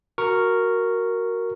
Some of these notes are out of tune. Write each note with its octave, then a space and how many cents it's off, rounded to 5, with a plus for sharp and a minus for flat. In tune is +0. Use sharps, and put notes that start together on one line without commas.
F#4 +0 A#4 -5 C#6 +0